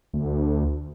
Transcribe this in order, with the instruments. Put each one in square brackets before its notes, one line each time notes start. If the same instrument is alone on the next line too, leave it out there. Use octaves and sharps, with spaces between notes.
[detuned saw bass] D2